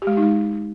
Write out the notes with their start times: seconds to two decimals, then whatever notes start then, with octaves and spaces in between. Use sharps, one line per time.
0.02 G4
0.07 G#3
0.12 G4
0.17 D#4
0.22 G#3